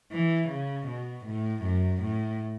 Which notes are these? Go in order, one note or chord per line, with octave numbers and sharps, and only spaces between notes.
E3
C#3
B2
A2
F#2
A2